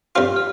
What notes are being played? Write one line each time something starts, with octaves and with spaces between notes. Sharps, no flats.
G2 G3 C4 F4 F6
F6